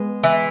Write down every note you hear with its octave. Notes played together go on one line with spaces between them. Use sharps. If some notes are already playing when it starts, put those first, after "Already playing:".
Already playing: G#3 B3
E3